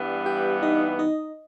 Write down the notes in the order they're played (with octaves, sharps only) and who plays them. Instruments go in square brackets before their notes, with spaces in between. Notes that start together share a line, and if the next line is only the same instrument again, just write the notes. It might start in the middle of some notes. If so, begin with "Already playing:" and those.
Already playing: [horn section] G2 E3 G3 B3
[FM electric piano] G4 G5
D#4 D#5
D#4 D#5